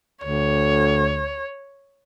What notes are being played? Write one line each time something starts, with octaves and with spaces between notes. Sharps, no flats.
D2 C#5